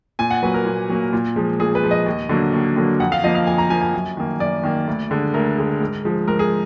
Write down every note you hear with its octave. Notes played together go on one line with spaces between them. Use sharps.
A#2 G#5
F#5
F#3 A#3 B4
A#4
A#2
F#3 A#3
A#2
F3 G#3
A#2 G#4
B4
F3 G#3
D#5
D#2
D3 F#3 A#3
D#2
D3 F#3 A#3
F2 F#5
F5
F3 A#3 D#5
F5
F2 G#5
A#5
F3 A#3 G#5
G#5
F#2
D#3 A#3
F#2 D5
D#3 A#3
D2
D3 G#3
D2 A#4
D3 G#3
G#2
F3 G#3
G#2 A#4
G#4